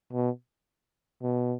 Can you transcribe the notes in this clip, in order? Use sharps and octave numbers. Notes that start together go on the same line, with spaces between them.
B2
B2